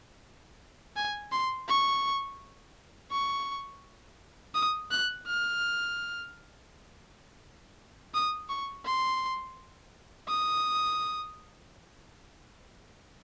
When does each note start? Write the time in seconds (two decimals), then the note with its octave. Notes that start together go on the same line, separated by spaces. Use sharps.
0.96 G#5
1.32 C6
1.68 C#6
3.11 C#6
4.55 D#6
4.91 F#6
5.27 F6
8.14 D#6
8.49 C#6
8.85 C6
10.28 D#6